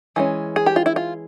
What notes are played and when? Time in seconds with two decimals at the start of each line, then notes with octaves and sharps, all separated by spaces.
0.16 E3 G#3 C#4
0.56 G#4
0.66 G4
0.76 F4
0.86 E4
0.96 F4